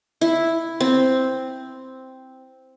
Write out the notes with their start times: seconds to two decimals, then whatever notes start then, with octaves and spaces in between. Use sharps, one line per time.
0.21 E4
0.80 C4